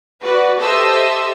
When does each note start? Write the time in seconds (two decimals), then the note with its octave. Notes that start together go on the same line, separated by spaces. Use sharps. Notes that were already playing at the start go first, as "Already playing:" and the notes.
0.23 F#4 B4 D5
0.58 G4 A4 C5 D#5 E5 E6